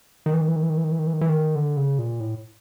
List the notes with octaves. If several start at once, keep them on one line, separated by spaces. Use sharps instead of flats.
D#3
E3
D#3
E3
D#3
E3
D#3
E3
D#3
E3
D#3
E3
D#3
E3
D#3
D3
C#3
A#2
A2